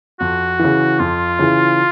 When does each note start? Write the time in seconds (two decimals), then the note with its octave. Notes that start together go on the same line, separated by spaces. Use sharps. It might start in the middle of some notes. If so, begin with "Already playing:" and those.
0.20 F2 F#4
0.59 C#3 E3
0.99 F2 F4
1.39 C#3 E3